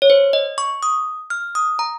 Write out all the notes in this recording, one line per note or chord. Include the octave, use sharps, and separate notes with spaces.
C#5
C5
D#5
C#6
D#6
F6
D#6
A#5